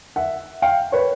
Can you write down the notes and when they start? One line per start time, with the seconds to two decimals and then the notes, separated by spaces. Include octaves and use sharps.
0.16 E5 F#5
0.62 F5 G5
0.92 B4 C#5